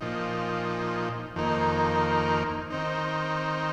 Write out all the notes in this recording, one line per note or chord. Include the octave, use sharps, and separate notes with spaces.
A#2 F3 D#4
F2 D#3 A#3 D#4
D#3 C4 D#4